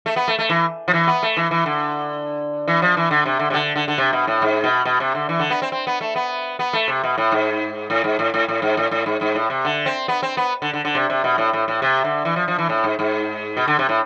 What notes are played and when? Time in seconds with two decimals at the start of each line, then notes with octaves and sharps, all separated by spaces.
0.06 A3
0.16 B3
0.28 A3
0.39 A3
0.49 E3
0.88 F3
0.93 E3
1.07 B3
1.23 A3
1.37 E3
1.51 E3
1.66 D3
2.68 E3
2.82 F3
2.97 E3
3.11 D3
3.26 C3
3.39 D3
3.50 C3
3.54 D3
3.76 D3
3.88 D3
3.98 C3
4.13 B2
4.27 A2
4.42 G#2
4.64 B2
4.85 B2
5.00 C3
5.15 D3
5.29 E3
5.40 D3
5.50 B3
5.62 C4
5.72 C4
5.87 B3
6.01 A3
6.16 B3
6.59 B3
6.73 A3
6.88 C3
7.04 B2
7.18 A2
7.32 G#2
7.90 A2
8.04 G#2
8.19 A2
8.34 A2
8.48 A2
8.62 G#2
8.77 A2
8.91 A2
9.06 G#2
9.21 G#2
9.35 A2
9.50 C3
9.65 D3
9.86 C4
10.08 B3
10.23 C4
10.37 B3
10.62 D3
10.73 D3
10.85 D3
10.95 C3
11.10 C3
11.24 B2
11.38 A2
11.53 A2
11.68 A2
11.82 C3
12.04 D3
12.25 E3
12.36 F3
12.48 F3
12.59 E3
12.69 A2
12.84 G#2
12.99 G#2
13.57 B2
13.68 D3
13.79 C3
13.89 A2